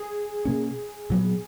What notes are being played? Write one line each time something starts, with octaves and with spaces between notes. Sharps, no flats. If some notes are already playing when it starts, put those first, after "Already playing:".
Already playing: G#4
B2 A#3 C#4
A#2 F#3 B3